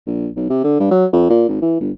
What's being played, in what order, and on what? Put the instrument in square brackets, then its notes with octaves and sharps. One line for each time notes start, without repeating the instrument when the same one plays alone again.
[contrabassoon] A#1
B1
C3
D3
G2
F#3
F2
A#2
G#1
E3
G1